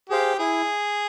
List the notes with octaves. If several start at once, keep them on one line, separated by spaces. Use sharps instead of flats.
G4 G#4 C5 F5
E4 G#4